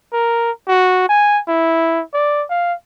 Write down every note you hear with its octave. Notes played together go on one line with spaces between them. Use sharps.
A#4
F#4
G#5
E4
D5
F5